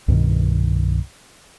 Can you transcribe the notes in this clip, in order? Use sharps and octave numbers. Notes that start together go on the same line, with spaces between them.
C2 G2 B2 D#3